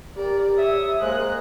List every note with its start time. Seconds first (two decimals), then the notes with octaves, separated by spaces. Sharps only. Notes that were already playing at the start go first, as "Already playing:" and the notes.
0.16 G4 A#4 D5
0.58 C#5 E5 D#6
1.01 G#3 A#3 C5 F#6